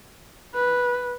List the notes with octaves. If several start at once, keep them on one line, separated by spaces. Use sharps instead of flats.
B4